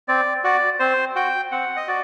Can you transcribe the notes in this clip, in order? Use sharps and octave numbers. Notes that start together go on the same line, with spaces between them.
C4 D5
F#4 D5
C4 C5
F#4 G5
C4 F#5
D#5
F#4 D5